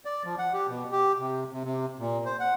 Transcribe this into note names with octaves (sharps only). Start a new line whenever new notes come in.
D5
F3
F#5
G4
B2
G4
C3
C3
C3
A#2
C5
F#5